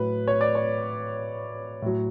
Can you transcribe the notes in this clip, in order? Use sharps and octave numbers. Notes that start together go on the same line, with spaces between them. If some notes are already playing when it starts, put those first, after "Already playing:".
Already playing: A2 F#3 B4
C#5
D5
C#5
A2 F#3